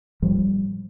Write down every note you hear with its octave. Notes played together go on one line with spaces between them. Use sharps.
A2 F3 G3 G#3